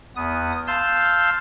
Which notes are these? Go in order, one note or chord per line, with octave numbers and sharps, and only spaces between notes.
E2 B3 D#6
F5 A5 C6 E6 G6